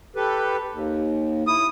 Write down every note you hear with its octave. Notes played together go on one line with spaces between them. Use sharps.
G4 A4 B4
D#2
E4 D#6